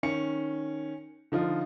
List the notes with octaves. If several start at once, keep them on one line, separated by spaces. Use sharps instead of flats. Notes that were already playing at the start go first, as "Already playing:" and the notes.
D#3 C#4 C#7
D3 F3 D#4 F4